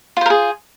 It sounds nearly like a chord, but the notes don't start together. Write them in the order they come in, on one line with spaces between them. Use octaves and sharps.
F4 C5 A#4 G#4